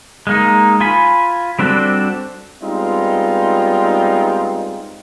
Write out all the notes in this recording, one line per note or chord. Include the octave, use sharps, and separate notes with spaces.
G#3 A#3 D#4
F4 G#5 B5
G3 C4 D4 F#4 A4
G3 G#3 B3 C4 D#4 F4